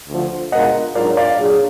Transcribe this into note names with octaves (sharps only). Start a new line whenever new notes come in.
D2 D3 F3
B2 G#3 D4 F4 A#4 D#5 F#5
G#2 F#3 D4 F4 A#4 D5 F5
D5 F5
A#2 F#3 D4 G#4